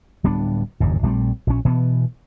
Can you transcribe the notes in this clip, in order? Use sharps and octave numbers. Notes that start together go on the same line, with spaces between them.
D1 G3 B3 D4
F#1 D#2 G#2
A#1 G3 A3 C4
A#1 C#4
B2 E3 B3